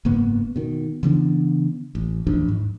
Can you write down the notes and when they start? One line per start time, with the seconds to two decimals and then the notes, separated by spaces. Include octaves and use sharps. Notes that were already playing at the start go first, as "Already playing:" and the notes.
0.05 F#1 G#2 A#3 B3
0.56 B2 D#3
1.03 C#3 E3 B3 D4
1.95 A1
2.27 A1 D#2 F3 D4
2.48 G#2